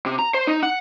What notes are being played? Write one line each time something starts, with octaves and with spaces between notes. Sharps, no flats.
C3
A#5
C5
D#4
F#5